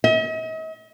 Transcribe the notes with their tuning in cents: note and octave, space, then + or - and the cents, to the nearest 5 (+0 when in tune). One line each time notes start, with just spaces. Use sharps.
D#5 +45